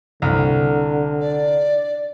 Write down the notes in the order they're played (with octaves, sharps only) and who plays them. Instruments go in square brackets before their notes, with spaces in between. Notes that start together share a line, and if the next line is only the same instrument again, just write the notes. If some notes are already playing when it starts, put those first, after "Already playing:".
[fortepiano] C2 [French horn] D3
[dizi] D5